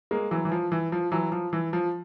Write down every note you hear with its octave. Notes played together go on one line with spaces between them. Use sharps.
G#3 A#3
E3 F#3
E3
F3
E3
F3
E3 F#3
F3
E3
F3